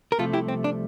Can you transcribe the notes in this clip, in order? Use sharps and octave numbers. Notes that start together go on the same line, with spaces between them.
A#4
C2 C3 F3 A3 F4 A4
E4 G4
C4
D4